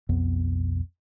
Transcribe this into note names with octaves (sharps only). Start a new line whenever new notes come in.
B1 F2 B3